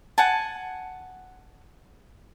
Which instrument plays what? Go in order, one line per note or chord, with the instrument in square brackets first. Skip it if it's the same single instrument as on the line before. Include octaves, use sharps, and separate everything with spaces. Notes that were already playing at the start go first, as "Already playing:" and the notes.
[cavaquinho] F#5 G#5 A5